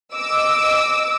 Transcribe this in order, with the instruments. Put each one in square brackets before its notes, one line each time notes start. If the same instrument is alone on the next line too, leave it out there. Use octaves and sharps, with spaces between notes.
[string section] D#5 D6 E6